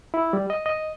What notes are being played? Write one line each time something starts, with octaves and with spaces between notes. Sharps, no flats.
E4
G3
D#5
D#5